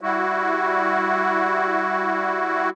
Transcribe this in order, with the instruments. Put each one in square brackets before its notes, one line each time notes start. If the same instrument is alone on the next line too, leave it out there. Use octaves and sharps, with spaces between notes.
[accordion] G3 E4 F#4